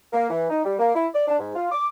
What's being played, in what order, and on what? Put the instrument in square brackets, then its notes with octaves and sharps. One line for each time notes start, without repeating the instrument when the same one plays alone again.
[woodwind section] A#3
E3
D#4
G3
A#3
E4
D5
D4
G#2
F4
D6